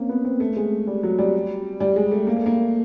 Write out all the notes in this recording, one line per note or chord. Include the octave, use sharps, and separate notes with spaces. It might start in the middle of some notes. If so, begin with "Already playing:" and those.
Already playing: A#3 C4 C#4
B3
C4
A3
G#3
G3
F#3
G3
G3
G#3
A3
A#3
A3
A#3